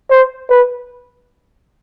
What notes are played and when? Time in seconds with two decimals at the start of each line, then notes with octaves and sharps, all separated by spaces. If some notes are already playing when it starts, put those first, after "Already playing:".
0.10 C5
0.50 B4